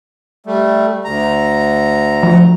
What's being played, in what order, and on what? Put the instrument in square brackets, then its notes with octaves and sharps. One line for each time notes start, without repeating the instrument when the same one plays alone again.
[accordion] G3 A3
D2 A#5
[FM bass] F3